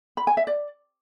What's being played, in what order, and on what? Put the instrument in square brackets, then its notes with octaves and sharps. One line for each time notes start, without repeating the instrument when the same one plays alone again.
[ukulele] B5
G#5
E5
D5